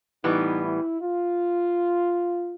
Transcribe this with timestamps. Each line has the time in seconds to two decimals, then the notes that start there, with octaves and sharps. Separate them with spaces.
0.24 A2 E3 G3 B3 D#4
0.63 E4
1.02 F4